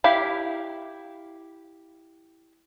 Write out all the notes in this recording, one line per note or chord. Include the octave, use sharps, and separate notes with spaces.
E4 G4 F5 B5